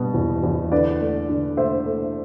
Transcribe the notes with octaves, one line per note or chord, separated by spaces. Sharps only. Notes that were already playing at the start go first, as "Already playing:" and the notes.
Already playing: B2 G3 B3
E2
E2
D3 B4 D5
A3
D3
A3 C5 E5
A3